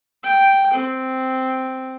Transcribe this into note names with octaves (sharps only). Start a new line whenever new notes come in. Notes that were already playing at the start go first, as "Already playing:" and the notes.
G5
C4